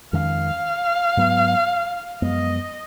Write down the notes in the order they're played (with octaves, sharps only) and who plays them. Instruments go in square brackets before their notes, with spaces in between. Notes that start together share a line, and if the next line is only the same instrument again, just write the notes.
[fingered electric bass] F2 D#3 G#3 C#4 [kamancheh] F5
[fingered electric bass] G#2 F#3 B3
[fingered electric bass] F#2 F3 G#3 B3 [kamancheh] D#5